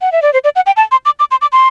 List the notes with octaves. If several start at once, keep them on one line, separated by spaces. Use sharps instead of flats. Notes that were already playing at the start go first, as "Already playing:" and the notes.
F#5
E5
D5
C5
D5
F#5
G5
A5
C6
D6
D6
C6
D6
C6